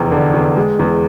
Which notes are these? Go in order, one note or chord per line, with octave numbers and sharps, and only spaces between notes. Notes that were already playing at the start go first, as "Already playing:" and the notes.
Already playing: F1 E2
D3
E2
G#3
E2